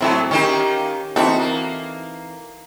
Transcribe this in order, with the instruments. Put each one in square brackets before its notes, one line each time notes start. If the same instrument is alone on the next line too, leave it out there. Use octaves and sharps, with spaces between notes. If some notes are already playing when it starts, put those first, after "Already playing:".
[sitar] A2 F#3 [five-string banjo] C4 E4 A4
[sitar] D#3 A#3 G4 [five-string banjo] C#4
[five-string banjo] E3 C4 A4 [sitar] D#4 F#4
[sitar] A#3